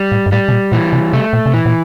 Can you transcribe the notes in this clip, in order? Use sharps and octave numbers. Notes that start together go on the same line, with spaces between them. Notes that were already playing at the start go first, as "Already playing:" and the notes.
Already playing: G3
A2
G2
A2 G3
C3
A#2
A#2 E3
C3
C3 A3
A#2
C3
A#2 E3
A#2